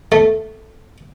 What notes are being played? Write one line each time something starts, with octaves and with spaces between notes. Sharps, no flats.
A3